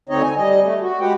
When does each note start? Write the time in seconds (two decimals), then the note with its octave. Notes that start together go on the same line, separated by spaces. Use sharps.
0.09 D2 D3 C4 D#4 C#5 D#5
0.23 G#5
0.37 G3 D#5
0.62 A3
0.82 F#4
1.01 G#3 G4 B4 F#5 G5